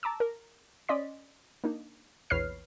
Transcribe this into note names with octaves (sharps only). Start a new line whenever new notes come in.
A5 A#5 D6 E6
A#4
C#4 D5 D#5 C6 B6
A#3 D4 D#4
A#1 E2 B4 C#5 F6 C7